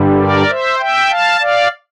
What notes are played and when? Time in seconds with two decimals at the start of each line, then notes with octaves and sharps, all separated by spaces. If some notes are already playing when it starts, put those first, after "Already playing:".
Already playing: G2 D3 G3
0.19 A#4 D5
0.49 C5 E5
0.79 E5 G5
1.10 F5 A5
1.41 D5 F5